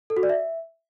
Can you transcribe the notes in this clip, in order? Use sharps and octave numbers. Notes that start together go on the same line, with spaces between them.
A4
F#4
D5
E5